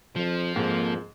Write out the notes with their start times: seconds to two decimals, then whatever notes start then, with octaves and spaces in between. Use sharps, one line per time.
0.16 F2 F3
0.56 F2 G#2 A#3